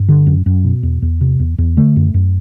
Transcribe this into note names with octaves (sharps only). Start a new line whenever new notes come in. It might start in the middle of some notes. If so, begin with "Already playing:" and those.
Already playing: G2
D3
F#2
F#2
B2
E2
E2
C3
E2
E2
D3 A3
F#2
F#2